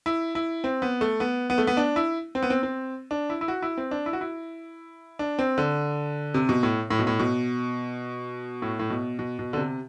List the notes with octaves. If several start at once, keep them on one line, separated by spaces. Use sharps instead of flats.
E4
E4
C4
B3
A3
B3
B3
A3
B3
D4
E4
C4
B3
C4
C4
D4
E4
E4
F#4
E4
C4
D4
E4
F#4
E4
D4
C4
D3
C3
B2
A2
A2
B2
A2
B2
A2
A2
B2
B2
B2
D3
C3